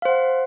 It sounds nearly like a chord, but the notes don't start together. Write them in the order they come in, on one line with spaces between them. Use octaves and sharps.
F5 C5 F#5